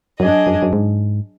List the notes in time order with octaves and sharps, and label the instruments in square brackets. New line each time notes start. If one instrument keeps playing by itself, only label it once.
[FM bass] F#2 [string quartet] F#3 D4 G#4 D#5
[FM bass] F#2
F#2
G#2